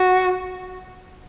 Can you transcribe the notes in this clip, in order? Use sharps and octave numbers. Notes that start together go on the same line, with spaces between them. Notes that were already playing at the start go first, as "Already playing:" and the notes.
Already playing: F#4